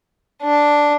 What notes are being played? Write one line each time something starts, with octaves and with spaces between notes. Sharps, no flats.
D4